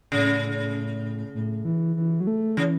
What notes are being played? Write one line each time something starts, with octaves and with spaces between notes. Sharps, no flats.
A2 C#3
A2
E3
E3
F#3
A3
C#3 E3